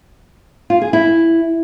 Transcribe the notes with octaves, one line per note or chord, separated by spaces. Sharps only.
F4
G#4
E4